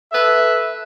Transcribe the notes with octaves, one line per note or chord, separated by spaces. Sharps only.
A4 B4 E5